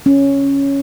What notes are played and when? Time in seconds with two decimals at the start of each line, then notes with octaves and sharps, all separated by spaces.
0.06 C#4